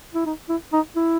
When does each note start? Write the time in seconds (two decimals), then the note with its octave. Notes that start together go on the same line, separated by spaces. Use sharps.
0.15 E4
0.26 D#4
0.49 E4
0.73 D#4
0.96 E4